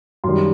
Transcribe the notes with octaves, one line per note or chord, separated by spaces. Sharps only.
F#2 D#3 G3 C6